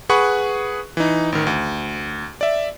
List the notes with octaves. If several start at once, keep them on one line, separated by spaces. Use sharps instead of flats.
G#4 B4 F#5 B5 C#6 F#6
E3 D#4
A1 D#3
D2
D5 E5